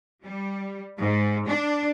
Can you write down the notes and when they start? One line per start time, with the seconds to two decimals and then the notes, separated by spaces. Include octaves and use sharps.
0.24 G3
0.99 G#2
1.47 D4